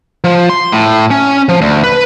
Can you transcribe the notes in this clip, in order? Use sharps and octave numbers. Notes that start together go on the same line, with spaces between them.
F3
C6
A2
C#4
F3
D2
B4